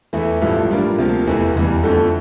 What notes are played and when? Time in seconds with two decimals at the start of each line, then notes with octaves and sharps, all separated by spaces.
0.13 E2 E3 A3 E4
0.41 A1 G2 F3 A3 E4
0.70 A2 G3 D4 F4 A#4
0.98 D2 C3 F3 A#3
1.27 F1 E2 E3 A3 E4
1.55 F1 E2 E3 G3
1.83 F2 D3 A3